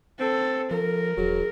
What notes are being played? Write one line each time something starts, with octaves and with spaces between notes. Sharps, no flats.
C4 A4
F3 A4 A#4
E1 F#3 G#4